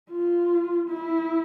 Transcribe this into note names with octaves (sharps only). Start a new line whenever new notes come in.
F4
E4